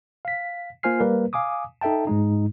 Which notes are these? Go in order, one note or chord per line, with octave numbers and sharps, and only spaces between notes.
F5 B6
A#3 F4 C5 G#5 F6 C7
G3 A#3 A#4 B4
F5 G#5 D6 D#6
D#4 A4 E5 G5 A5
G#2 G#3 D#4